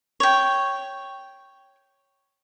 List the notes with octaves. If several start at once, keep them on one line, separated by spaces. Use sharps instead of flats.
C#5 G5